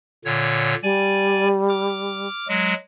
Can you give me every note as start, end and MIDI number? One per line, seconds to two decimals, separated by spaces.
0.25 0.75 46
0.25 0.75 50
0.25 0.75 73
0.83 2.28 55
0.83 1.48 74
0.83 1.48 80
1.69 2.48 86
1.69 2.48 89
2.48 2.74 54
2.48 2.74 56